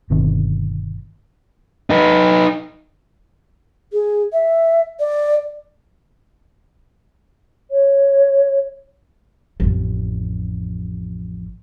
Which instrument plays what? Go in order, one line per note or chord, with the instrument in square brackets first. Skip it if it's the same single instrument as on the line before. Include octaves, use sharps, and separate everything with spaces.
[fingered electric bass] G1 B2 D#3 C4
[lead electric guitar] D#4 B4
[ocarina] G#4
E5
D5
[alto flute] C#5
[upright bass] A1 F2